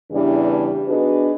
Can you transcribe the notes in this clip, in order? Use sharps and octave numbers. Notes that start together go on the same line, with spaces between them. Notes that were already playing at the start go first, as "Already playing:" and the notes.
E2 C#3 E3 G3 D4
B3 D4 D#4 F#4 G#4 B4